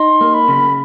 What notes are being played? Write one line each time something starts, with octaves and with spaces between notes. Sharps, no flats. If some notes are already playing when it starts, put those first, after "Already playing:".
Already playing: D#4 C6
A#3
B5
C#3